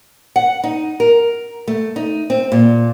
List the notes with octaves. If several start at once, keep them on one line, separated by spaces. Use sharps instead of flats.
F#5
D#4
A#4
A3
D#4
C4
A#2